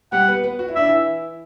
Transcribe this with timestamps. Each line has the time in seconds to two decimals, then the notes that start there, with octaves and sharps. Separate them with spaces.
0.12 G3 G4 F#5
0.28 B3 B4
0.43 B3 B4
0.59 F#4
0.68 E4
0.75 D4 E5
0.85 E3 E4